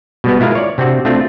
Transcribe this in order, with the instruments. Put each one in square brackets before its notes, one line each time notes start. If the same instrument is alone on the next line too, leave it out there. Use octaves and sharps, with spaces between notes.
[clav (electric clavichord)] B2 G3 B3
G#3 E4 F4 A#4 F5
C#5 D5
C3 C4 D4 F#4
A3 C4 D4 F4